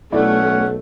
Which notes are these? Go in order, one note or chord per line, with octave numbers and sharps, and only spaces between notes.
B1 A3 C#4 E4 D5 F#5